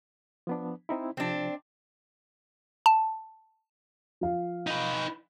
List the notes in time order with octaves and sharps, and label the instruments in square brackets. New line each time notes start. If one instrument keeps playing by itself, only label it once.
[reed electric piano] F3 B3 D4
C4 D#4 E4
[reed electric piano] C3 F3 [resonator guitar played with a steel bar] C4 D4
[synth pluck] A5
[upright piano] F3 F5
[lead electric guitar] D#4 B4